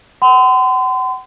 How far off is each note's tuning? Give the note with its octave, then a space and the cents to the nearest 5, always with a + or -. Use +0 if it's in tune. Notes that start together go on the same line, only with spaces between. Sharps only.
F#5 +35 C6 -40